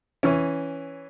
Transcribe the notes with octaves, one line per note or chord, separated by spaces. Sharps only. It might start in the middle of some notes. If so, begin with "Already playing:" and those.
E3 C#4